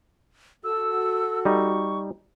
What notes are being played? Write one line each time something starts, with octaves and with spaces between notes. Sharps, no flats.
F#4 A4 E6
G3 D#4 C#6